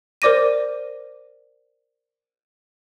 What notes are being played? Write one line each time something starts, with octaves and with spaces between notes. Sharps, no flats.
A#4 C5 D5 D6 A#6 D#7